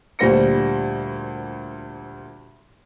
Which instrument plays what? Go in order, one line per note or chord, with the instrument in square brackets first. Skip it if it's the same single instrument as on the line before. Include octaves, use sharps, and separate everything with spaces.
[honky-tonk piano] D2 A#2 G3 C5 A#6 C#7